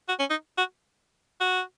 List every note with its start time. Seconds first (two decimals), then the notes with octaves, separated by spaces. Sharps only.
0.08 F#4
0.19 C#4
0.30 D#4
0.58 F#4
1.40 F#4